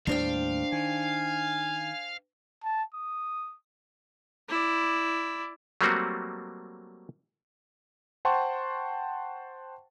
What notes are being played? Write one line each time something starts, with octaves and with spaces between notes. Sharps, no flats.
D#2 A2 G3 D4 C5 F5 G5
D#3 G#5
A5
D#6
E4 D5
F#3 G3 A3 A#3 C4 F#4
C5 F#5 G5 A5 C6 C#6